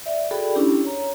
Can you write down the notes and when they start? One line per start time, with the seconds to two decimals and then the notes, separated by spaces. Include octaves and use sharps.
0.06 D5 E5
0.31 F#4 G#4 A4 D5 G5 B5
0.55 C#4 D4 E4 G4
0.85 C#5 A#5